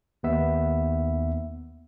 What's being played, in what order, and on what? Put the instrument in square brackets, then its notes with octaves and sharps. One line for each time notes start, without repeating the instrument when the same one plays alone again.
[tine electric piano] D#2 B3 E5